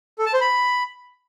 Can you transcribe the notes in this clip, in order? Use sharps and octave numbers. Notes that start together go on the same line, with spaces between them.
A4
A5
C5
B5